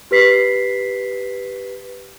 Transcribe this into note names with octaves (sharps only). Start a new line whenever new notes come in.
G4 B4 B6 C7